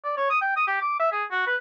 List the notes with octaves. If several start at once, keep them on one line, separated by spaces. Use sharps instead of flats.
D5
C#5
D#6
G5
D#6
G4
D6
E5
G#4
F#4
B4